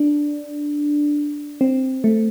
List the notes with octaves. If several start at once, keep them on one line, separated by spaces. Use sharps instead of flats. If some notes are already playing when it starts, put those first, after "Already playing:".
Already playing: D4
C4
A3